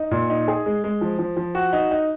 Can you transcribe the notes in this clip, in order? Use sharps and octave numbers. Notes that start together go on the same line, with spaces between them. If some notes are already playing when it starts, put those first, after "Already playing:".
Already playing: D#4
A#2
D#4
G#4
G#3
G#3
F3
F3
F3
F#4
D#4
D#4